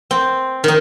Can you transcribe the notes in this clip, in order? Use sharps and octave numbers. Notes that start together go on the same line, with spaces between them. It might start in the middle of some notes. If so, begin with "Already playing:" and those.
C4
D#3 D#4